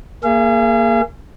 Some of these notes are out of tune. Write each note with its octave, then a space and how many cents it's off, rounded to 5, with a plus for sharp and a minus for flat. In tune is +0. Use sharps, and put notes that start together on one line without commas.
A#3 +0 G#4 +0 F5 -45